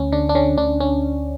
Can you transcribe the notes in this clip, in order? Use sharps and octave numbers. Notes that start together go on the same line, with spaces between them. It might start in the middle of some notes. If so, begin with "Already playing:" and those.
Already playing: D2 C#4
D3 D4
D4
D3 C#4
D2 D4
C#4